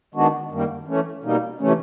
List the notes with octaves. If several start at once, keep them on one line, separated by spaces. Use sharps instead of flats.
D#3 G#3 B3 D4 F#4
F#2 D#3 G3 A#3
E3 A3 C#4
B2 G3 A#3 D#4
C3 E3 A3 C#4